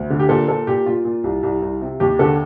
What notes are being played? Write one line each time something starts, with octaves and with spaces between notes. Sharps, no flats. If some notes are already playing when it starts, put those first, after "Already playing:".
Already playing: D2
D3
G4
A#2 A4
A#2 A4
A#2 G4
A#2 F4
A#2
C2
C2
C2
C3
D#2 G4
D3 A4